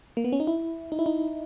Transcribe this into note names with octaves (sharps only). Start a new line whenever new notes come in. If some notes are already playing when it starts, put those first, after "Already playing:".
A#3
B3
C#4
D#4
E4
D#4
E4
D#4